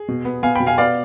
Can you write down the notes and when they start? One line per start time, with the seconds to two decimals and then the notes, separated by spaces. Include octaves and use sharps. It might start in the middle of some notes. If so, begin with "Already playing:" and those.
Already playing: G#4
0.08 B2
0.25 B3
0.43 B3 F5 G#5
0.55 B2 G5 B5
0.67 F5 G#5
0.78 B3 D5 F5